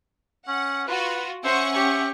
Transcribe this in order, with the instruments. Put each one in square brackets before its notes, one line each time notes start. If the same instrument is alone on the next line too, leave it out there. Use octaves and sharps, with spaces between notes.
[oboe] C#4 [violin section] F#5
[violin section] F4 F#4 [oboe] B4
[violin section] C#4 F#5 C#6 [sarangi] C5 [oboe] E5
[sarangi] G4